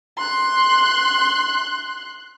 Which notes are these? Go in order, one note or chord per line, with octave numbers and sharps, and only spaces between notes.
C6 F#6